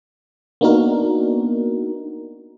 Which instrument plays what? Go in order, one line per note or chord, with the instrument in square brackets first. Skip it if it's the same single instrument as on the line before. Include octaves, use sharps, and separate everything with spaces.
[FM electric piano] A#3 B3 D4 D#4 F#4 A#4